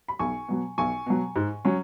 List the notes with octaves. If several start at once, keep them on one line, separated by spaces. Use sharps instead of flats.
B5
B1 G#5 C#6
B2 F#3
B1 G#5 C#6
B2 F#3
G#2
F#3 C#4